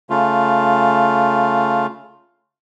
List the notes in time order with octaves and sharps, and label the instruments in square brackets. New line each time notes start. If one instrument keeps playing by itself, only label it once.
[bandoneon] C#3 A3 F4